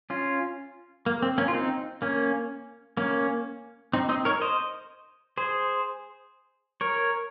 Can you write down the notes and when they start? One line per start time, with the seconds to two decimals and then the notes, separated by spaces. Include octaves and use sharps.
0.10 C#4 F4
1.06 A#3
1.23 C4
1.38 A#3 C#4
1.48 F4
1.54 C4 D#4
2.02 A#3 C#4
2.97 A#3 C#4
3.93 C4 D#4
4.09 C4 D#4
4.25 A#4 C#5
4.41 C5 D#5
5.38 G#4 C5
6.81 A#4 C#5